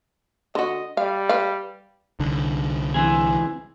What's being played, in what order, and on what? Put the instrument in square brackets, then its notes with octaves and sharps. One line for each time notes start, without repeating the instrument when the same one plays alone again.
[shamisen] D3 F#4 [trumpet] D#5
[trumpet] G3 [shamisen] F5
[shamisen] B4 F5
[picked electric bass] C2 D3
[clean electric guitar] E3 C4 G#4